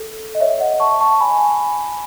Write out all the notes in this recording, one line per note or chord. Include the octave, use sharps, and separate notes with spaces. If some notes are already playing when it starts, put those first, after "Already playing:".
Already playing: A4
D#5
C#5 E5
D#5 F#5
A5 C#6
A5 C#6
G#5 B5